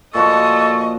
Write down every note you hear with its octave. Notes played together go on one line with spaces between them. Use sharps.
A#2 F3 F#4 A4 D#5 C#6